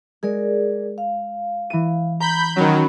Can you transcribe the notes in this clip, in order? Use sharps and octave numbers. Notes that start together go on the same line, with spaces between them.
G#3 G#4 A#4 D5
F5
E3 D#7
A#5 B5 G6
D#3 F#3 C#4 B5